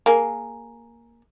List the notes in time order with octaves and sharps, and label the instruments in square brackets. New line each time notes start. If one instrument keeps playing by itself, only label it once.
[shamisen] A#3 G#4